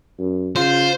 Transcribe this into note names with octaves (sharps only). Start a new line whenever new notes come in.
F#2
C#3 F4 C5